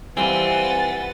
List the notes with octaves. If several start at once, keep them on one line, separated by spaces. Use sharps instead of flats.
E3 G3 C4 F4 B4 F#5 G#5 A6